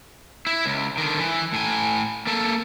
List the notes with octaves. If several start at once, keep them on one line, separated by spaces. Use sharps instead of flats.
E4
C#2
D3 D#3
E3
A2 G#5
A#3 A4